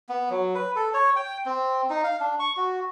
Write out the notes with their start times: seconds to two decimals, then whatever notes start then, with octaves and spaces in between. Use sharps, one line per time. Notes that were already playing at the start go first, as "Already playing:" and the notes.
0.09 B3
0.30 F#3
0.55 B4
0.76 A4
0.94 C#5
1.16 G5
1.46 C4
1.90 D#4
2.04 F5
2.20 D4
2.40 C#6
2.57 F#4